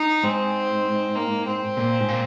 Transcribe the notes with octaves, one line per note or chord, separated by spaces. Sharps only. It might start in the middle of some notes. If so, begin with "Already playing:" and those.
Already playing: D#4
G#2 C4
A#3
C4
A#2
G#2
A#2